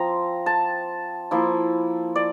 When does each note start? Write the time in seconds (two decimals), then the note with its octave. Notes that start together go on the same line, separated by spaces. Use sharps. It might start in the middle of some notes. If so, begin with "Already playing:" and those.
Already playing: F3 C4 F4 A#5
0.46 A5
1.31 F3 A#3 E4
2.16 D5